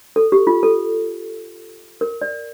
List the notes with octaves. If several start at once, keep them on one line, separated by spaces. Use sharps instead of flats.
A4
G4
F4
A4
A#4
D5